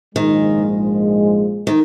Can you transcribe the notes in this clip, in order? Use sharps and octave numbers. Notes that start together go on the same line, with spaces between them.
A#1 G#2 D#3 F3 G#3
D#3